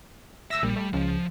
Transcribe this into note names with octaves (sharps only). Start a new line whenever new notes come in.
D2 E5 E6 A#6
A#1 A#2 G3
A3
C#2 F3